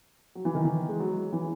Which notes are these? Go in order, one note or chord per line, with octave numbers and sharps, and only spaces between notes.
F#3
E3
D#3
E3
G#3
F#3
E3